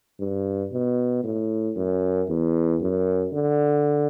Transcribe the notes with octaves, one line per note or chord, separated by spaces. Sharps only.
G2
B2
A2
F#2
E2
F#2
D3